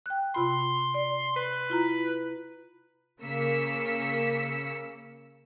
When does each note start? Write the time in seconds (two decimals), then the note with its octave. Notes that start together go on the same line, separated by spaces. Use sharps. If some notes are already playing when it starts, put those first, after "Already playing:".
0.06 G5 F#6
0.35 C3 F4 B5 C6
0.94 D5
1.36 B4
1.70 E4 F4 A#5
3.22 C#3 A#3 E6 B6 C#7